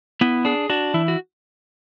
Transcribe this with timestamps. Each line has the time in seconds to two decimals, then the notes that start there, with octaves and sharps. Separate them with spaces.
0.21 B3 E4
0.45 D4 G#4
0.69 D4 F#4
0.94 E3 E4
1.08 F#4